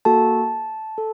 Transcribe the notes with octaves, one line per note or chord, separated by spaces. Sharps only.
A#3 F#4 A4 A5
A4